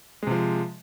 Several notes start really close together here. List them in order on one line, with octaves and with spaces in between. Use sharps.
G#3 C3 F3